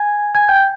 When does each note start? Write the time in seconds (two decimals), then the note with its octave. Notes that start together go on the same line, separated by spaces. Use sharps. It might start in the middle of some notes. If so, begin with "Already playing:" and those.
Already playing: G#5 G#6
0.35 G#5 G#6
0.49 G5 G6